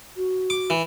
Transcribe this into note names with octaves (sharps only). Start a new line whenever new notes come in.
F#4
D6
E3